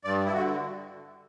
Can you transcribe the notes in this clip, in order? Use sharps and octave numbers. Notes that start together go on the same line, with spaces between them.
G2 D5
E4
D3 F#4